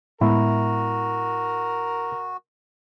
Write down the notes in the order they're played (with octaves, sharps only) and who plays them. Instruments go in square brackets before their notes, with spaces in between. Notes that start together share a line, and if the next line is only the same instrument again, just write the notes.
[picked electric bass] A2 G#3 B3 [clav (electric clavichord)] E4 [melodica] F#4 [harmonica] A#4